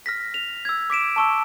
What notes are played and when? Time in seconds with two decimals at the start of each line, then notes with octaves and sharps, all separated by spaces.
0.06 F6 A#6 B6
0.34 F7
0.65 E6 G#6
0.90 D6 B6 D7 E7
1.16 A5 C#6 E6